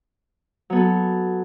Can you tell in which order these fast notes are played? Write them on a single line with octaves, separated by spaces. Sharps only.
F#3 B3 A4